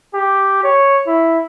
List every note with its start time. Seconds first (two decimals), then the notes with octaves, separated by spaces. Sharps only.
0.14 G4
0.63 C#5
1.07 E4